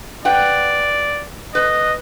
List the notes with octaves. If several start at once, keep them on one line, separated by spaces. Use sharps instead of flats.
B4 D5 F#5 G5
B4 D#5